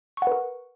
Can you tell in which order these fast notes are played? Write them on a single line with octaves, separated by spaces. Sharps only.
C#6 F#5 B4 A#4